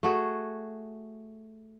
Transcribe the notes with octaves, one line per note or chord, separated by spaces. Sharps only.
A3 F#4 G#4